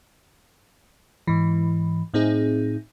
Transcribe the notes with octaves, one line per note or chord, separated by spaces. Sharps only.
G#2 E3
A2 C4 D#4 G#4